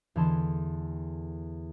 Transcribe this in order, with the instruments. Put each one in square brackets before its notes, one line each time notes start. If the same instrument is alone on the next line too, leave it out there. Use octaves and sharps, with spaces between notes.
[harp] E2 D3 E3 A4 A5 C6